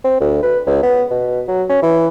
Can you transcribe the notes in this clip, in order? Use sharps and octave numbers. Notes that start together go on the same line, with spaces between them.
C4
D2
B4
C#2
B3
B2
F#3
C#4
E3